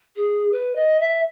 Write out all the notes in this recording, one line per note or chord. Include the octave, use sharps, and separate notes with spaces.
G#4
B4
D#5
E5